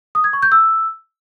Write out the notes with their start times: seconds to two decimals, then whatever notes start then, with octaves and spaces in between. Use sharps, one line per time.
0.15 D#6
0.24 G#6
0.33 C#6
0.43 G6
0.52 E6